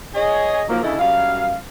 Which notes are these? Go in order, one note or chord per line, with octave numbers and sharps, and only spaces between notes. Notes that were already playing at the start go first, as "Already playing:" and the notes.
G#4 C#5 D#5
D#3 F3 F#3 A#3
D2 C#3 A3 E4 A4 D#5
F#2 F#3 G3 F5